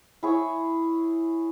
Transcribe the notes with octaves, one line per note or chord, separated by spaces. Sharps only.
E4 G#4 C#5